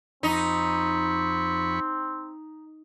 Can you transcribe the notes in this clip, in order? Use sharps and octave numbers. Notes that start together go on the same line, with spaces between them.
F2 C4 D#4 B5 C#6